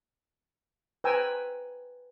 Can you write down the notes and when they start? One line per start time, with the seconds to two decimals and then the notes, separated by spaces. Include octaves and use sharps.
1.04 B4 C5 G5 G#5 A#5 E6